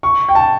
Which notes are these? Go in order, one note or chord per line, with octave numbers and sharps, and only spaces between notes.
C#6
G5
A5